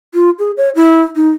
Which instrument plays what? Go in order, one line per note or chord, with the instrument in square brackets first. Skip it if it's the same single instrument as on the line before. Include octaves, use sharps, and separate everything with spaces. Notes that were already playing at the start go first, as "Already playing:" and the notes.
[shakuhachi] F4
G#4
C#5
E4
D#4